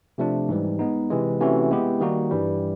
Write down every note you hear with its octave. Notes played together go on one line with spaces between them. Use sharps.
C3 F3 A3 D4
G#2 E3 G3
G#3 B3 D#4
C3 E3 G#3
C3 E3 A3 C#4 F#4
G#3 B3 E4 G4
D#3 G3 A#3 D#4 F#4
G2 E3 G3